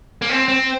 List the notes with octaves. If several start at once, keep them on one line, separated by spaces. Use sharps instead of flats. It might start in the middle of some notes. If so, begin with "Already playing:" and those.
A#3
C4
C4